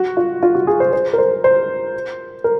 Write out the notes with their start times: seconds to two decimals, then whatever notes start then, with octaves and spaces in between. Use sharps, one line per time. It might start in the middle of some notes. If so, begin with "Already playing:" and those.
Already playing: F#4
0.17 F4
0.43 F4
0.55 F#4
0.67 G#4
0.80 C5
0.93 C5
1.13 A#4
1.18 C5
1.44 C5
2.44 A#4